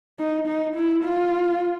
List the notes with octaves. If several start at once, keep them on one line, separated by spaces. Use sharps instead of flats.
D#4
D#4
E4
F4